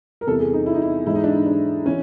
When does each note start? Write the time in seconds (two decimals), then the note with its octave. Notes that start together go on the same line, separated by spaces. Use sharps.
0.21 A#4
0.27 E2 C3 E3 G3 A4
0.40 G#4
0.53 D#4
0.66 E4
0.74 D#4
0.82 E4
1.06 G#2 E3 G#3 E4
1.15 D#4
1.24 D4
1.34 D#4
1.46 D4
1.86 E3 C#4